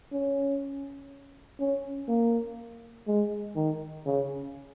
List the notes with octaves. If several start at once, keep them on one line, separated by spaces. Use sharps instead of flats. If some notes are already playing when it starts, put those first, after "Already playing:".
C#4
C#4
A#3
G#3
D#3
C#3